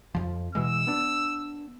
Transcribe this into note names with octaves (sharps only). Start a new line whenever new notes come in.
F2 F3
B2 E3 G#3 E6
B3 D4